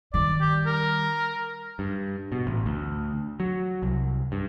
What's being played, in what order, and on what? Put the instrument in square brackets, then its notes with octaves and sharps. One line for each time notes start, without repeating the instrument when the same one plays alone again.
[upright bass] D#3 G3 [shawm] D5
[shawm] G4
A#4
[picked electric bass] G2
B2
A1
D2
F#3
C2
G2